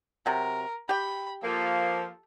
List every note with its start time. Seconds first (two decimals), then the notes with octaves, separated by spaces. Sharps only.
0.26 C3 F#3 A#4
0.89 G4 G5 B5
1.43 F3 A#3 A4